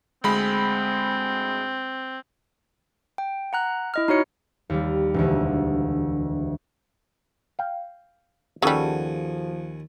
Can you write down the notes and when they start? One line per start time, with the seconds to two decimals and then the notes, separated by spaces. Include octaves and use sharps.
0.24 D2 G#3 C4 B5
3.18 G5
3.53 F#5 A#5 F#6
3.94 E4 D#5 F6
4.08 D#4 F#4 C#5 C#7
4.70 D#2 G3
5.14 E1 D2
7.59 F5 G5
8.62 D#2 C#3 F3 G3 F#4 A4 G#5